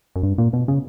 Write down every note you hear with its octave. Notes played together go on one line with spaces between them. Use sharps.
F#2
G2
A#2
B2
C#3